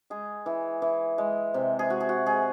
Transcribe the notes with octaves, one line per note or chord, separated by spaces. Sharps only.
G#3 G#4
E3
E3
G#3
C3
G#4
G#3 F#4
G#4
F#4
G#3 G#4